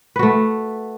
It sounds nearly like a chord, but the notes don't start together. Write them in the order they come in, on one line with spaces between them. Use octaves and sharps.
B4 F#4 A3